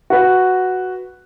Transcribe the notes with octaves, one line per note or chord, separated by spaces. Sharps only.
F#4 B4